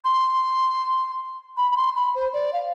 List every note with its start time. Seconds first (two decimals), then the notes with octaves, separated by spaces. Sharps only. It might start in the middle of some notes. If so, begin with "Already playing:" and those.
0.05 C6
1.57 B5
1.71 B5
1.76 C6
1.96 B5
2.15 C5
2.33 D5
2.53 F5